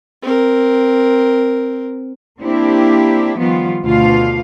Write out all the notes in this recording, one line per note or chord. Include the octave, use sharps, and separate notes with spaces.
C4 A#4
A#3 C4 D4 E4 G4
D#3 F3 G3 B3 F4
D2 B2 D3 F4 F5